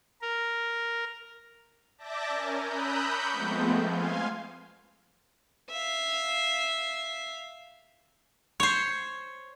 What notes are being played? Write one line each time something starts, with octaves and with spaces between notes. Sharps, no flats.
A#4
D5 E5 A5 D6 G6 A#6
C#4 A#4 G#5
A#5 B5 D#6 E6 F#6 G6
B5 C#6 D6 G6 C#7
F3 G#3 A3 B3 C4
F5 G#5 C6
E5 F5
C5 C#5